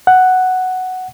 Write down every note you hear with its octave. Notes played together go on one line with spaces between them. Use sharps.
F#5